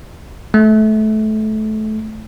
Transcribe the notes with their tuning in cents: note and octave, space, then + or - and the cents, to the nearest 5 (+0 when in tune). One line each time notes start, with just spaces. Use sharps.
A3 -25